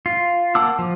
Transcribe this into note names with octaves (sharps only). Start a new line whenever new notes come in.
F4
A#3 F#5 A5 D6 E6
F3